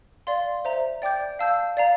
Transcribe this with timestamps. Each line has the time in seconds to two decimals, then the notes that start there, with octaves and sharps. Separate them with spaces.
0.27 D5 F5 C6
0.65 C5 E5 A#5
1.02 D5 G5 D6 G6
1.39 F5 A5 E6 G6
1.77 D5 F5 A#5